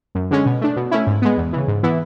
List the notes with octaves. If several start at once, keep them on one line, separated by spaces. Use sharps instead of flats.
F#2
D3 G#3 C#4
B2
A3 D4
B2
A3 C#4 E4
G#2
G#3 B3
E2
C#3 E3
G#2
E3 B3 E4